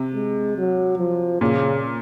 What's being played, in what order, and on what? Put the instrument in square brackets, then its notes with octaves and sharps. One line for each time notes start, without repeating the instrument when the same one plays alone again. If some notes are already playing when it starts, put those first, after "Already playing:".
Already playing: [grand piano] C3
[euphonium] G#3
F#3
F3
[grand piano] A#2 [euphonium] C#3